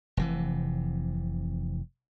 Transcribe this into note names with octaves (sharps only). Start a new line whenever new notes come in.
F1 C3 E3